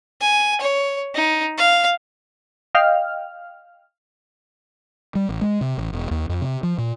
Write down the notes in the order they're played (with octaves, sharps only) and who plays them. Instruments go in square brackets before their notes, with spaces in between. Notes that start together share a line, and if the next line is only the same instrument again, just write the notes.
[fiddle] G#5
C#5
D#4
F5
[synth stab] D#5 F5 G5 F6
[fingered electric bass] G3
A1
G#3
C3
A1
E1
D#2
F2
C3
F3
A#2